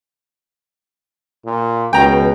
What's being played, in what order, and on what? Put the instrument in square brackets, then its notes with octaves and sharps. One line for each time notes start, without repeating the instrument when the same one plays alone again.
[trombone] A#2
[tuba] C#2 [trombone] B2 [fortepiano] G5 A#5